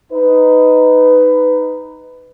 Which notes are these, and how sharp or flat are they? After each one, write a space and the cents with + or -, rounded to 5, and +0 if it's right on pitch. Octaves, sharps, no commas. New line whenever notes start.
D#4 +0 B4 +20